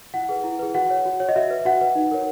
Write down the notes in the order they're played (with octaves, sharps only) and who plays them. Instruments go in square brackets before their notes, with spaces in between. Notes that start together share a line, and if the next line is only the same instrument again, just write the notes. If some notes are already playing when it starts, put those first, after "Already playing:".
[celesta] E4 F#5
G#4 B4
E4
G#4 B4
F#4 F#5
C#5
F#4
C#5
D#5
F#4 E5
B4
F#4 F#5
B4
D#4
A#4 C#5